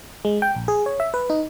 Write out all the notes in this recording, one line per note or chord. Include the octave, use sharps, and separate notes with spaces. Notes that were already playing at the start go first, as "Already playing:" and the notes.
G#3
G5
A#1
G#4
C#5
E5
B4
D#4